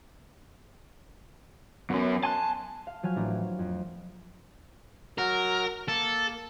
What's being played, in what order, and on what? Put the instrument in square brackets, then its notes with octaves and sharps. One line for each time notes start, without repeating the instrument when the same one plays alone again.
[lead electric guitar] F#2 C#4 [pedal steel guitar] B3
[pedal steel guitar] G#5 C6 F#6 [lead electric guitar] A5
[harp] F5
F3 F#3 G#5 F6
A1 A2 D4 A#5
A#4
F2
[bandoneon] F#3 F#4 [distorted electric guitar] A#4
[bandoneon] A#3 [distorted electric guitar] A4